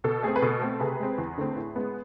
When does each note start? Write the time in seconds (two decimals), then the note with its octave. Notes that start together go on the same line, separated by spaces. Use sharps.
0.04 B2 A4
0.23 A3 C4 G#4
0.36 B4
0.42 B2 A4
0.61 A3 C4
0.80 C3 G#4 B4
1.00 G#3 C4
1.18 E2
1.38 D3 A3 C4
1.56 A2
1.76 G#3 B3